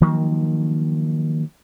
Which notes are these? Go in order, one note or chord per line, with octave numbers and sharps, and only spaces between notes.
D#3 F3 F#3 A#3